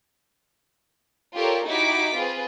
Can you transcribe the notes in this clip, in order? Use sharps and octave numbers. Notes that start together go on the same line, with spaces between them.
F4 G4 A4 A#4 C#5 D5
D#4 E4 F#4 G4 D6 B6
C4 F4 G#4 B4